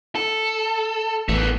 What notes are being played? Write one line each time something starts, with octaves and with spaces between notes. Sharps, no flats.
A4
A1 A3 B3